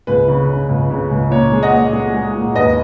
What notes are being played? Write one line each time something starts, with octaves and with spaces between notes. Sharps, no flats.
C#2 B4
C#3
C#3
C#2
C#3
C#2
A#2 C#5
G#3
D#5 F#5
A#2
G#3
G#3
A#2
D#2 B4 D#5